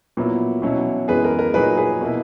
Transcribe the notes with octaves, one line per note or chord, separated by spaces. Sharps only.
A#2 F#3 B3 E4
B2 F#3 C#4 E4
F#2 E3 G#3 B3 G#4 B4
A#4
A#4
A#2 F#3 A#3 D#4 G#4 B4
G#4 B4
B2 A#3 E4